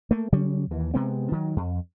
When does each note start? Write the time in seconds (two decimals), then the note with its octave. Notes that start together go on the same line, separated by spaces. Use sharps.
0.11 A3 A#3
0.32 C#3 F#3 G3 C#4
0.71 D#2 E3
0.94 C3 G#3 B3 C4
1.32 D#3 F#3
1.56 F2